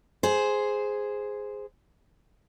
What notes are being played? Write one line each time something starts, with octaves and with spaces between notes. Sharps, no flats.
G#4 C5